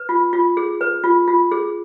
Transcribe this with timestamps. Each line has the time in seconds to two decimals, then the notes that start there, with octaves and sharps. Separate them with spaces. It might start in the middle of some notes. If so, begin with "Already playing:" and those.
Already playing: B4
0.09 F4
0.33 F4
0.57 G#4
0.81 B4
1.04 F4
1.28 F4
1.52 G#4